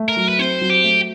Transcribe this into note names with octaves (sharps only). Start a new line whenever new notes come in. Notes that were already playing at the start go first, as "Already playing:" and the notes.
Already playing: A3
A#4
F#3
B4
C4 C5
F#3
G4
A3